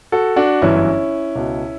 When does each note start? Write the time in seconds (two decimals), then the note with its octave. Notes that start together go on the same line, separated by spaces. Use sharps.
0.12 F#4 A4
0.36 D4 F#4
0.62 G1 F#2 E3 C#4 E4
1.35 C#2 B2